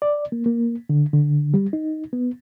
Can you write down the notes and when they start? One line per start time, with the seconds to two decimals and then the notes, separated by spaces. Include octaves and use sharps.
0.02 D5
0.32 A#3
0.46 A#3
0.89 D3
1.13 D3
1.54 G3
1.73 D#4
2.13 B3